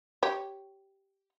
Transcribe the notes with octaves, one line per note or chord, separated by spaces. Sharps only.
G4 C#5